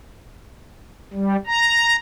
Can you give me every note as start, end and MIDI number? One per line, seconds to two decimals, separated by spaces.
1.13 1.36 55
1.47 1.96 82